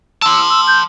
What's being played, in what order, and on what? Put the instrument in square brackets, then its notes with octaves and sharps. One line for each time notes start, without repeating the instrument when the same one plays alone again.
[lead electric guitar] A5 C6 [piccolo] E6
[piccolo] E6
G6